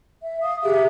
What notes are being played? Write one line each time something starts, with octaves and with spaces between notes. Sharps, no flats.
E5
F5 D#6
G4 G#4 E5